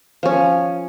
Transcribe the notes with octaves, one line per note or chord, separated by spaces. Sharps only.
F3 C#4